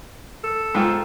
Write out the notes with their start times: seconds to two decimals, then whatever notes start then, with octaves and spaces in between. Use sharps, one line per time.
0.44 A4
0.75 G#2 F4 G5